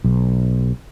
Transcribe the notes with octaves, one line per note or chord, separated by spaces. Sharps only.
B1